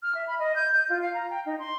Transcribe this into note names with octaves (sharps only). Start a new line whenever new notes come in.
F6
E5
B5
D#5
G6
G6
F4
F5
A#5
G5
D#4
C6